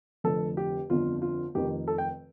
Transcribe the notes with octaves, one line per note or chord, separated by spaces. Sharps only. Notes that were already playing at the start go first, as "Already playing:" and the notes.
F1 F2 D3 A4
G4
G1 F2 D3 F4
F4
F1 F2 C3 D#3 G4
A4
G5